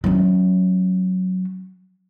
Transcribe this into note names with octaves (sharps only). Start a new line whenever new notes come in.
F#3 C#4